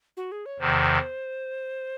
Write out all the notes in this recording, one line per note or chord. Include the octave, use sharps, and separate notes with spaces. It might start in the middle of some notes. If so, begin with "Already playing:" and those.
F#4
G#4
C#5
E2 C3 D#3 C5